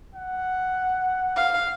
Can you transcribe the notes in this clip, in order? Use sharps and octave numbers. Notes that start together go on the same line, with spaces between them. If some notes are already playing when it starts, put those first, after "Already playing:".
F#5
F5